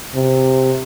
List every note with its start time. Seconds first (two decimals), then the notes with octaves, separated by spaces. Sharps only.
0.15 C3